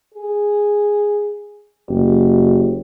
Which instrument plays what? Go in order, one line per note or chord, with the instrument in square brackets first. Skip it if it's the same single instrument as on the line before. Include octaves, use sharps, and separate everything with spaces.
[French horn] G#4
[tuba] F#1 [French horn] G4